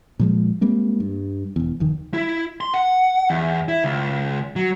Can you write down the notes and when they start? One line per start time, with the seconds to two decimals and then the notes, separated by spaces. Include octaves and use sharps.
0.19 A#2 F3 G#3
0.61 G3 G#3 A#3 C4
1.00 G2
1.56 E1 E2
1.80 F1 D#2 D#3
2.14 E4
2.61 C6
2.74 F#5
3.30 E2
3.68 E4
3.84 C#2
4.56 F#3